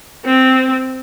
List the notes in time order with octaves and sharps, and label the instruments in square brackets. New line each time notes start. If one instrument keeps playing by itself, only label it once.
[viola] C4